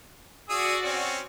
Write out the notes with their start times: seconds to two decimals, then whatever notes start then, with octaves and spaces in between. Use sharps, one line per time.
0.49 F#4 G#4 D5 D#6 E6
0.84 C4 C#4